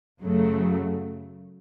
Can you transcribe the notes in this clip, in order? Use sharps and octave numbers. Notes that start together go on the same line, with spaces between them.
F#2 C#3 F#3 A3